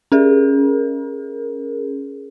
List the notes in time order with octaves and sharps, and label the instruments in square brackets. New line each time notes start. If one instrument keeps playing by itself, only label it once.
[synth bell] C#4 G#4 A#4